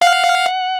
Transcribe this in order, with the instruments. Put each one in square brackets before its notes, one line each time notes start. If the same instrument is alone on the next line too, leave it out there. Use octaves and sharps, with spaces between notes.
[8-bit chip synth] F5 [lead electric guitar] F#5